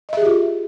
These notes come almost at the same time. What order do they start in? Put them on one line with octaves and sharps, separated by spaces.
D#5 E5 G#4 G4 F4